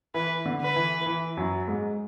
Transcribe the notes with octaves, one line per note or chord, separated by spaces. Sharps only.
E3 B4
D3
B4
E3
E3
F#2 F#3
G#2 G#3